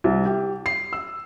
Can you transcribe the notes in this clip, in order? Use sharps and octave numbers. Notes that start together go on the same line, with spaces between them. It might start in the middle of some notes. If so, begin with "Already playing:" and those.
C2
G4
C7
E6